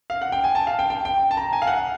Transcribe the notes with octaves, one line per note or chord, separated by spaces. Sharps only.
F5
F#5
G5
G#5
A5
F5
G5
G5
G5
A5
A#5
G#5
F5
F#5